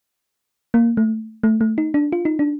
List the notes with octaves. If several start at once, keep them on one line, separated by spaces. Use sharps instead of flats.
A#3
A3
A3
A3
D#4
D4
F4
D#4
D4